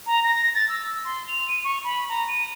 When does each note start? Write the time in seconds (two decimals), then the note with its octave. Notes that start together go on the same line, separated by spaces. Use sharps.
0.06 A#5
0.24 A#6
0.55 A6
0.69 E6
1.05 C6
1.28 F7
1.48 D#7
1.64 C#6
1.84 B5
2.09 A#5
2.28 D#7